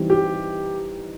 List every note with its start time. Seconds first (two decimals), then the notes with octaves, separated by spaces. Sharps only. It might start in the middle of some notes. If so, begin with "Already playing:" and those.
Already playing: E3 G3 C4 D#4
0.10 G4